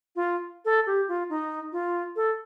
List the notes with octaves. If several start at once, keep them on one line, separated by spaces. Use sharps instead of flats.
F4
A4
G4
F4
D#4
F4
A4